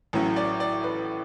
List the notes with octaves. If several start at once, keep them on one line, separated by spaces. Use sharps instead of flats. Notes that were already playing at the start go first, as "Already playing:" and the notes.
A1 A2 F#3 C#4
D5
D5
B4